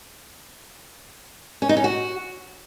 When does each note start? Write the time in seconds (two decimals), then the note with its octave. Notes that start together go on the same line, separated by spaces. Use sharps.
1.62 C#4
1.69 D#4
1.77 C#4
1.84 F#4